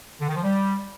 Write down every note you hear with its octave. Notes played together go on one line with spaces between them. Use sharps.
D3
D#3
F3
G3